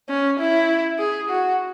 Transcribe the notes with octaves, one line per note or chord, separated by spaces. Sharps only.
C#4
E4
G#4
F#4